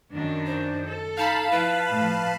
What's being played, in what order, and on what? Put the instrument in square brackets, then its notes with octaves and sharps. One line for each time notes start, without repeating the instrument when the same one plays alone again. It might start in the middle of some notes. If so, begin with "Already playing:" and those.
[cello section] F#2 D#3 D4
[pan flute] C5
[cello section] A4
[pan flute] D#4 [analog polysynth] F5 A5 B5
[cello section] F3 E4 [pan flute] B4
[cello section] A2 F3